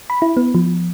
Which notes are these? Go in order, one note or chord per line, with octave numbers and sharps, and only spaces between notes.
B5
E4
B3
F3